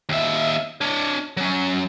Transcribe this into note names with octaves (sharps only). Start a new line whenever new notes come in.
D#2 E5
D4 C#5
F#3 C#4